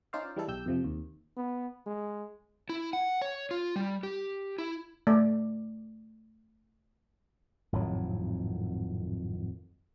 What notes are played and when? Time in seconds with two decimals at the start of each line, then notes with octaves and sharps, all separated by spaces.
0.13 C#4 D#4 F4 C5 D5 F5
0.36 E3 G3 G#3 E4 A4
0.48 B1 G4 E6 G6
0.66 F2 C3 F3
0.84 D#2
1.37 B3
1.86 G#3
2.69 E4
2.93 F#5
3.22 C#5
3.51 F4
3.76 G3
4.03 G4
4.58 E4
5.07 A3 D5
7.72 G#1 F2 A2 F#3